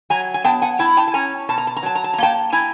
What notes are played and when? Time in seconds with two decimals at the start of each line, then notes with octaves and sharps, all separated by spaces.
0.10 F#3 G#5 A#5
0.34 G#5
0.44 B3 G5 A5
0.62 F#5 G#5
0.79 E4 G5 A5
0.97 G5 A5
1.08 A5
1.14 C#4 G#5 A#5
1.49 B2 A5
1.58 A#5
1.67 A5
1.76 A#5
1.83 F#3 A5
1.95 A#5
2.04 A5
2.14 A#5
2.18 A#3 G5 A5
2.52 E4 G#5 A#5